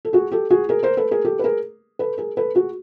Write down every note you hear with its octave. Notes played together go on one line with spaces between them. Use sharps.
A4
F#4 G#4
G4 A4
F#4 G#4
G#4 A#4
A#4 C5
A4 B4
G#4 A#4
G4 A4
B4
G#4 A#4
A4 B4
G#4 A#4
A4 B4
F#4 G#4